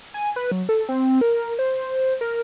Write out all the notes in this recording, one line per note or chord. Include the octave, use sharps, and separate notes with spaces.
G#5
B4
F#3
A4
C4
A#4
C5
A#4